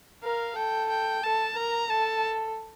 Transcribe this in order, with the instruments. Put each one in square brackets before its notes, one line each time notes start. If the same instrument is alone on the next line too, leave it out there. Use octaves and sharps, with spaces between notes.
[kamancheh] A#4 [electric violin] F5
[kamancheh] A4 [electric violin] G5
[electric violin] G5
[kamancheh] A4 [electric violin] A5
[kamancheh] A#4 [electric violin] A#5
[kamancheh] A4 [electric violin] A5